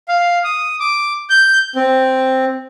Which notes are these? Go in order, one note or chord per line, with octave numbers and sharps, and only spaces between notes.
F5
D#6
D6
G6
C4